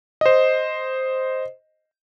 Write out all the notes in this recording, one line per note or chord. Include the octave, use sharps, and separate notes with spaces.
C5 D#5